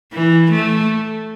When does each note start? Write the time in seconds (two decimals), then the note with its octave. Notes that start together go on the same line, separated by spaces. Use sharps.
0.13 E3
0.51 A3